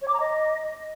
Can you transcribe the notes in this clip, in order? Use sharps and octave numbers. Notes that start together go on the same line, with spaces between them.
C#5
D6
A#5
D#5